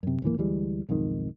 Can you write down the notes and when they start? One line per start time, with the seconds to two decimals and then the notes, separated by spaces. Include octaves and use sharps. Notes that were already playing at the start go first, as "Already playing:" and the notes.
0.03 F#2 C3
0.22 D1 G#1 E3 A#3
0.38 D2 E3 G3 G#3
0.89 B1 F2 G#2 D#3